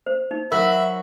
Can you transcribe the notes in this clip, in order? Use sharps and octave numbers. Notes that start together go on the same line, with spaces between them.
C5
D#4
F#3 F#4 A#4 E5 B5